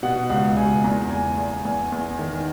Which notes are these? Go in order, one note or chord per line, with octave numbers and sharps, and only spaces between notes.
B2 F#5
C#2 F#5
C#2 G#5
E2 A#5
E2 G#5
E2
E2 G#5
E2
D#3